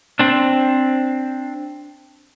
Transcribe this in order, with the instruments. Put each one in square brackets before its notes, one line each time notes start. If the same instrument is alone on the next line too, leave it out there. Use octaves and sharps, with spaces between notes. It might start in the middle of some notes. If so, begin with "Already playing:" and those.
[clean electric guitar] C4 D4